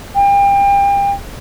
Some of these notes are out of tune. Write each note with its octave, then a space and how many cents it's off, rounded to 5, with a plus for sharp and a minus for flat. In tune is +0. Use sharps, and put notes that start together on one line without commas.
G5 +35